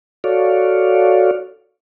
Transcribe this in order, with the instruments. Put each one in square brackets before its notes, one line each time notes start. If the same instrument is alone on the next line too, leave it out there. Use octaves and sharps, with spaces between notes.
[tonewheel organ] F#4 A4 C#5 D5 F5